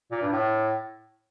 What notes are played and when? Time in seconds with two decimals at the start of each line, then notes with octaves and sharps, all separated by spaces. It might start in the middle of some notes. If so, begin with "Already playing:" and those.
0.11 A#2
0.22 G2
0.32 A2